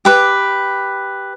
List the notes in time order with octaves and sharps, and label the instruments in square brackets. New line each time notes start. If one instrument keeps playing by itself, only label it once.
[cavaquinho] G4 B4 D6